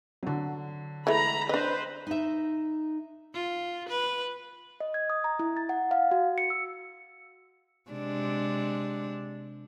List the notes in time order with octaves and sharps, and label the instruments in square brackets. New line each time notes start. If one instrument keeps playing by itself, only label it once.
[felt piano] D3 F#3
[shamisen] E3 G#3 A3 [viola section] A#5 B5
[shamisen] D4 D#5 [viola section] B4 C5
[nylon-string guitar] D#4 E5
[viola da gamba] F4
B4
[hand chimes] D#5
G#6
D#6
A#5
E4
A6
F#5
F5
F#4
C#7
E6
[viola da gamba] C3 G#3 D4